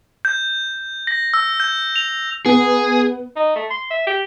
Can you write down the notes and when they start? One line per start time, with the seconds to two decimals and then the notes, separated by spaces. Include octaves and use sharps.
0.25 G6
1.07 A#6
1.34 E6
1.60 G6
1.96 F7
2.46 B3 G#4
3.36 D#4
3.56 A3
3.71 C6
3.91 E5
4.07 G4